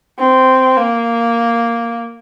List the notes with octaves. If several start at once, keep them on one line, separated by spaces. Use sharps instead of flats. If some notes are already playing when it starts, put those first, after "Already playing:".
C4
A#3